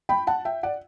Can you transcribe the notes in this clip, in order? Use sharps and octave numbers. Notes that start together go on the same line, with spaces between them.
G5 B5
F#5 A5
E5 G5
D5 F#5